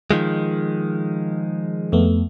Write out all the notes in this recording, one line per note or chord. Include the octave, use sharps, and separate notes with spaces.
D#3 F3 G#3
F2 A3 B3